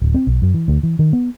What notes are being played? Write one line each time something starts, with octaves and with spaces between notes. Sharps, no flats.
D1
C4
B1
F#2
E3
D2
E3
D#3
B3